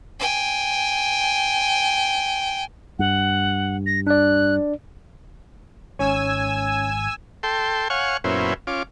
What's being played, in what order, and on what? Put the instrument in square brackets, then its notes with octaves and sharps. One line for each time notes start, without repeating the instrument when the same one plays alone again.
[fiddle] G5 G#5
[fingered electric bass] G2 [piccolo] F#5
[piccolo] A#6
[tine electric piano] D4 D5 [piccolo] F#6
[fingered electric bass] G#1 G#2 [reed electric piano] C#4 C#5 [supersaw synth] G#5 E6
[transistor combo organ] A4 G5 C6
C#5 F5 F#5 G#5 C#6
F#2 A#2 B3 C#4 E4 C5
C#4 F4 D6